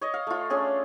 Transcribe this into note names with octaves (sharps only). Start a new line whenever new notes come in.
C#5 D#5
F5
A3 F4
A3 C#4 D4 G#4